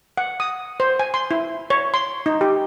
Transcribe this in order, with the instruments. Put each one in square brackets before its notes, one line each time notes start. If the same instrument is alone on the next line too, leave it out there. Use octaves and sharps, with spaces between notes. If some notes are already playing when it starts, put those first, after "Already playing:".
[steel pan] F#5
D#6
C5
G#5
C6
E4
C#5
C6
D#4
G4